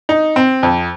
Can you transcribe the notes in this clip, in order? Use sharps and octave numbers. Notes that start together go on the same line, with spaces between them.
D#4
C4
F2